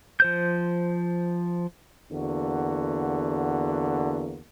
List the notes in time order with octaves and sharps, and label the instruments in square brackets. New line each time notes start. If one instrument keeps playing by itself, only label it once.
[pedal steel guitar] F3 C5 G6
[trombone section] E2 D3 A#3 F#4